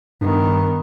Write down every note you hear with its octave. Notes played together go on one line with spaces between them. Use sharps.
G2 D#3 B3